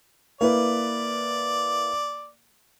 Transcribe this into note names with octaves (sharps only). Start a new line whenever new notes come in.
A#3 E4 B4 D5